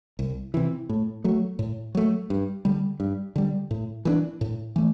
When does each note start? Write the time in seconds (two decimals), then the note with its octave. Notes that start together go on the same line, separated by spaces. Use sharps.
0.19 C2
0.54 C3 E3
0.89 A2
1.24 F#3 A3
1.59 A2
1.95 F#3 A3
2.30 G2
2.65 D3 G3
3.00 G2
3.36 D3 G3
3.71 A2
4.05 E3 A3 D4
4.41 A2
4.76 E3 A3